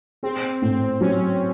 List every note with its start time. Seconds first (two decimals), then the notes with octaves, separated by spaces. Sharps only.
0.23 C4 G#4
0.62 A2 C4
1.01 F#3 C#4